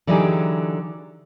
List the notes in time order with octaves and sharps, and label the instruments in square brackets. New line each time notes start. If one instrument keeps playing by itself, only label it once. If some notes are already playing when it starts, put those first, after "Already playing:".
[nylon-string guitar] D3 E3 F#3 D#4 G4 G#4